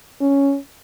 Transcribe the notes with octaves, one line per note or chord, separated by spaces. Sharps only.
C#4